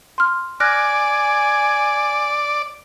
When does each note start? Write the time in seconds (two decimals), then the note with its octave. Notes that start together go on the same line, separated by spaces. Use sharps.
0.18 C6 F6
0.60 D5 G#5 F6 F#6 A#6